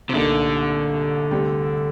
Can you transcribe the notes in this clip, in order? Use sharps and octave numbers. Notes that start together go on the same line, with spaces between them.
C3
C2 A#2 D3 A3 D#4 A#4
D2 C3 G3 C4 G4